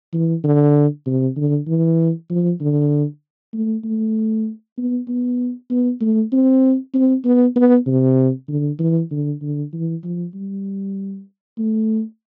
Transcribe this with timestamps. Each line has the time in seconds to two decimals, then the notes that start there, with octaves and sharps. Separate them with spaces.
0.13 E3
0.44 D3
1.06 C3
1.37 D3
1.67 E3
2.30 F3
2.61 D3
3.54 A3
3.84 A3
4.78 B3
5.08 B3
5.70 B3
6.01 A3
6.32 C4
6.94 C4
7.25 B3
7.56 B3
7.87 C3
8.49 D3
8.79 E3
9.11 D3
9.42 D3
9.73 E3
10.04 F3
10.34 G3
11.58 A3